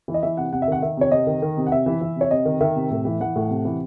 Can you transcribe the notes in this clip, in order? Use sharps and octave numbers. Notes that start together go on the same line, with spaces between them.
E3
D#5
E3 E5
C3 F#5
C3 F#5
E5
D#3 F#5
D#3 E5
C3 C#5
C3 D#5
D#3
D#3
C3
F#5
C3 E5
E3
E3
C3
C#5
C3 D#5
D#3
D#3 E5
C3
A2
E3
E3 F#5
A2
C3
E3